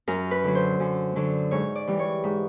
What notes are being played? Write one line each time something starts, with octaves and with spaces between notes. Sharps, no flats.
F#2 A#4
B4
D3 F#3
C5
F#2
D3 F#3
G#2 C#5
D5
E3 G3
C#5
G#2